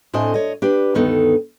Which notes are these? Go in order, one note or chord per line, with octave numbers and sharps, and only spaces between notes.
A2 C4 D4 D#5 G#5
C#5 D#5
D4 G4 B4
D2 G2 D#3 B3 D#4 A4